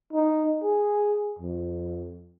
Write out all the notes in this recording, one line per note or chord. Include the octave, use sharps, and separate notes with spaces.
D#4
G#4
F2